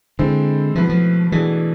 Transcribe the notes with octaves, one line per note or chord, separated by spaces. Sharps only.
D3 G#3 C4 E4 A4 C5
B2 F3 A3 E4 B4
F3
B2 E3 A3 D4 G#4